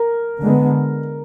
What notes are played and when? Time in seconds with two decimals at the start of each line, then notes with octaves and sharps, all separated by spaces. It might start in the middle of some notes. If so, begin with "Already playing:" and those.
Already playing: A#4
0.43 D3 G#3 B3